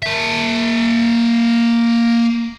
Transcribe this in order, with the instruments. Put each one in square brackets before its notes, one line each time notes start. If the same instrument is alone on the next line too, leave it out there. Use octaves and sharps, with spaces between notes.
[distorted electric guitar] A#3 E5